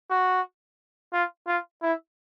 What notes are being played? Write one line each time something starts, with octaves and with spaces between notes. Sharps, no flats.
F#4
F4
F4
E4